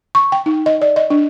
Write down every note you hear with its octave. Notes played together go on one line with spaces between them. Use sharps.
C#6
G5
D#4
D#5
D5
D#5
D4